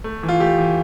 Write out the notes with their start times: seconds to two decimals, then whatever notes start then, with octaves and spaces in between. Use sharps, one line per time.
0.04 A3
0.23 E3
0.29 F4
0.40 A3 G4
0.58 E3